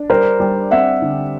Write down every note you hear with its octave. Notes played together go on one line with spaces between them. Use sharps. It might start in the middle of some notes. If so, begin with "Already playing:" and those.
Already playing: D4
G3 A#4 C5
G3
C4 E5 F#5
D3